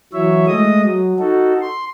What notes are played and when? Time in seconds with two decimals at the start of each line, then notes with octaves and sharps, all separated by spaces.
0.13 E3 F#3 C#5 E5
0.47 G#3 A3 D#5 D#6
0.84 F#3
1.19 D#4 F#4 A4
1.61 C6